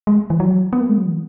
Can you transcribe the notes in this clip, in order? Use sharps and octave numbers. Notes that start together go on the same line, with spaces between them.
G#3
E3
F#3
B3
A#3
G#3
F#3
E3